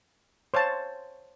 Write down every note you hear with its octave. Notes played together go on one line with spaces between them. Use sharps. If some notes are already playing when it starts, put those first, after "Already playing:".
C5 C#5 F5 A5